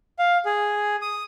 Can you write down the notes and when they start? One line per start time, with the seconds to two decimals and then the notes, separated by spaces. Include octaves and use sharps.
0.19 F5
0.45 G#4
1.02 D#6